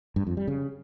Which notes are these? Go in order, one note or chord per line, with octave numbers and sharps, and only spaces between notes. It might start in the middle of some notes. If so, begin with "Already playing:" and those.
G2
F2
G3
C#3